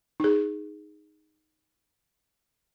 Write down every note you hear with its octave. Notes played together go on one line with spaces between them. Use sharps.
D#4 G#4